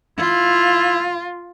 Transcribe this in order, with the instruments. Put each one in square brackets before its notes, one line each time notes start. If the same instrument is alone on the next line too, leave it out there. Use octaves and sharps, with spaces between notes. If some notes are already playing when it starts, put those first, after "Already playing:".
[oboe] E4 [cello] F4